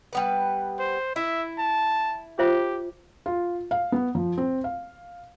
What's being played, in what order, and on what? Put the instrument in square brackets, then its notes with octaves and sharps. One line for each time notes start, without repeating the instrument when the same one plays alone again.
[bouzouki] G3 B3 B4
[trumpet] C5
[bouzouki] E4 [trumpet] E5
[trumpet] A5
[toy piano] F4 C5 E5 [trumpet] G4
[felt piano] F4
F5
B3
F3
C4
F5